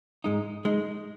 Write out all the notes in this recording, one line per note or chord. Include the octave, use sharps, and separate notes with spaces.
G#2 G#3 D#4
G#3 D#4